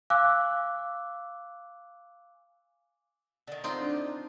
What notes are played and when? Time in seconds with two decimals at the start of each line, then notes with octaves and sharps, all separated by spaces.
0.10 F5 G#5 D6 E6 F#6
3.47 D3 D#3
3.64 C4 D#4 F4
3.81 D4